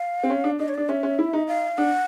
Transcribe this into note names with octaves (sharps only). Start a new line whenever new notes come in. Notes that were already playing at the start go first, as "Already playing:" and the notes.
Already playing: F5
C4
C#4
D4
D4 D#5
C#5
D4 D5
C#4 E5
C#4
E4
D#4
F5
D4 F#5